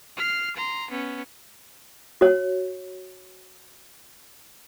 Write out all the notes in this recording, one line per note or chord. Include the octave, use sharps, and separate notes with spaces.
F6 C7
A#5 C6
B3 C#4
F#4 C#5